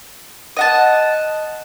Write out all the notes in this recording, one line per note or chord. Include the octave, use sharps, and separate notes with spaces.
D#5 F#5 A5